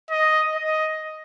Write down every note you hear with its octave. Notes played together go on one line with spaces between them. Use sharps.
D#5
D#5